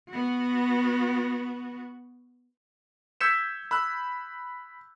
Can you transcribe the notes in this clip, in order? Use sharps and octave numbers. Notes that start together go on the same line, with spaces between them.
B3 F#4
E6 G6 G#6 B6 C#7 E7
B5 E6 F#6